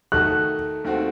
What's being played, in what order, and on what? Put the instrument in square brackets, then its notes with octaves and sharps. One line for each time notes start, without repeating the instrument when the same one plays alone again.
[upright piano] D#3 A3 D#4 F#4 A4 [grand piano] F#6
[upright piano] D#2 D#3 A3 C4 F#4